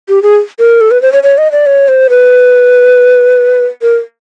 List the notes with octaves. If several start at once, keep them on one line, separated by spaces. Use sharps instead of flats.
G4
G#4
A#4
A4
B4
C5
C#5
C#5
D#5
D5
C#5
C5
B4
A#4